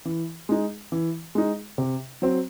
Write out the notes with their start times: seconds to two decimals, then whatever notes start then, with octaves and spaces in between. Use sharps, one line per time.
0.05 E3
0.49 G#3 D#4
0.92 E3
1.35 G#3 D#4
1.78 C3
2.22 F#3 C4